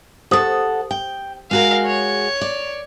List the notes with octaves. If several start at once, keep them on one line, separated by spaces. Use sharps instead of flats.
G4 A4 C5 F#5 D#6
G5
G#3 F#4 G#4 A#4 F5
C#5
D5